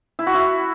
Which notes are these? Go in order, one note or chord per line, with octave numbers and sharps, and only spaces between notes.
E4
F#4
E4